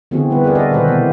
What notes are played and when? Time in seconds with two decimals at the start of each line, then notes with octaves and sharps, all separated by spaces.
0.11 D3 E3 B3 C4 F#4 G#4
0.30 D3 G3 B3 D#4 B4
0.44 G#4 A#4 B4 D5
0.55 F#4 A4 D5 D#5
0.71 B2 D#3 G#3 A4 B4 C5
0.87 C3 E3 B3